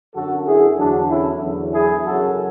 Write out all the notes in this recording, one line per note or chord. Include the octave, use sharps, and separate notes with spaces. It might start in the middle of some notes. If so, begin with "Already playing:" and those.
F#2 D3 F#3 F#4 A4
E4 G#4
E2 D3 F#3 D4 F#4
C#4 E4
E2 D3 F#3
E4 G#4
F#2 C#3 F#3 F#4 A4